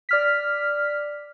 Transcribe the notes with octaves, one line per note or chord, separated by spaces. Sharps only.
D5 F6 B6